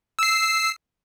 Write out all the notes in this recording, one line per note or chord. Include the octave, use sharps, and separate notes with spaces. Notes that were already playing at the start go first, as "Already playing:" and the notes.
E6 C7